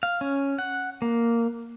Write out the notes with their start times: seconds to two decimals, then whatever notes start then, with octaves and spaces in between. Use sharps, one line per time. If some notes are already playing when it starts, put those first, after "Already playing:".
0.03 F5
0.21 C#4
0.58 F#5
1.02 A#3